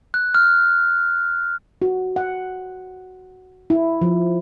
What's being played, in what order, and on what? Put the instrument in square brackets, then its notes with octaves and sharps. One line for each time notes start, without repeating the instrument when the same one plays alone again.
[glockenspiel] F#6
F6
[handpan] F#4
F#5
E4
F3